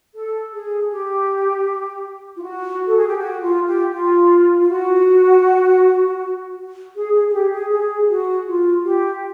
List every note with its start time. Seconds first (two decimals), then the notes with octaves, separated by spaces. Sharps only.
0.15 A4
0.52 G#4
0.90 G4
2.36 F4
2.42 F#4
2.87 A4
2.97 G#4
3.07 G4
3.18 F#4
3.42 F4
3.67 G4
3.92 F4
4.61 F4
4.69 F#4
6.95 G#4
7.14 G#4
7.29 G#4
7.33 G4
7.52 G#4
7.70 G#4
8.09 F#4
8.47 F4
8.84 G4